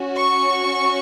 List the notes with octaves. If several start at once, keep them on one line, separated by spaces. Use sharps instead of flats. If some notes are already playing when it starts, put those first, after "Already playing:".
Already playing: C#4 F#4
C#6